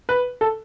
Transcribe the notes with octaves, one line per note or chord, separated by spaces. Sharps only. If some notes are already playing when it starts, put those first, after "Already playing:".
B4
A4